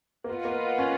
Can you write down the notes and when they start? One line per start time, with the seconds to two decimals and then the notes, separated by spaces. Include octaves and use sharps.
0.24 A#3
0.29 B3 F4 B4 D#5 F#5
0.45 A#3
0.49 B3
0.78 C#4